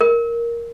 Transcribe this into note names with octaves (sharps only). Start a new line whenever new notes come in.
A#4